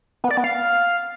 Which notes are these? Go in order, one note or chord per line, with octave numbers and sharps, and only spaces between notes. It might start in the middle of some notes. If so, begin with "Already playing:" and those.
B3
D5
B3
F5